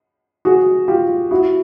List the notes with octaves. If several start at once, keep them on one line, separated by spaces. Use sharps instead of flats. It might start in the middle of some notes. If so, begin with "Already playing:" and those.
F#4 G#4
F4 G4
E4 F#4